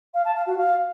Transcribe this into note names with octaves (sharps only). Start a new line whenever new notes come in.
F5
A5
F5
F#4
F5